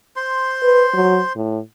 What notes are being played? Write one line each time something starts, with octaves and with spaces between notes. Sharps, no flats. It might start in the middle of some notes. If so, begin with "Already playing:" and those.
C5 C6
B4
F#3
A2